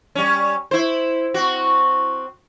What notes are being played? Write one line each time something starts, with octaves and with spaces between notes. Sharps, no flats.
G3 C#4
E4 C5
C4 F#4